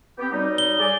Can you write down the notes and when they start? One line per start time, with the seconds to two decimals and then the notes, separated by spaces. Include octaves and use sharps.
0.18 B3 C4 G4
0.32 F#3 G3 D#4
0.58 G7
0.79 G#4 D5